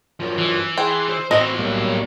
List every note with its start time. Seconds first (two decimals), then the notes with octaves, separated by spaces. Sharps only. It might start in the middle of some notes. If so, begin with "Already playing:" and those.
0.20 F#2 F3
0.38 E3
0.78 E4 G#4 G5 C6
1.09 C5
1.31 A2 E3 C4 E4 F#4 D#5
1.59 B1 F#3 G3 A#3